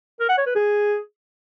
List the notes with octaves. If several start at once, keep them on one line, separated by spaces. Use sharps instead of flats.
A#4
F#5
C#5
B4
G#4